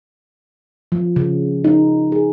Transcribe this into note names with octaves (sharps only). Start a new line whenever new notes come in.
F3
C#3
D#4
G#4